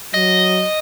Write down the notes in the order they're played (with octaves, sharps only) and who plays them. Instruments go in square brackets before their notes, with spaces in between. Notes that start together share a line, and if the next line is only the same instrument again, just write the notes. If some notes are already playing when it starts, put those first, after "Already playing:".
[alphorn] F#3 [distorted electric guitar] D#5